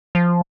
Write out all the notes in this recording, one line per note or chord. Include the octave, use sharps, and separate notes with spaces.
F3